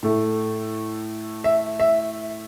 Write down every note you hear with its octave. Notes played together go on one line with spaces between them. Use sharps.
A2 A3
E5
E5